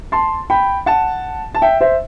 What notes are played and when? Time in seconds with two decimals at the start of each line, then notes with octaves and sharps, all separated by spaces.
0.12 A5 C6
0.50 G5 B5
0.86 F#5 A5
1.55 A5
1.62 E5 G5
1.81 C5 E5